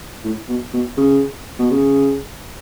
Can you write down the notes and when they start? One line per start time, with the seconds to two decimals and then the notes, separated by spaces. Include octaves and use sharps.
0.24 A2
0.49 B2
0.73 B2
0.97 C#3
1.59 B2
1.71 C#3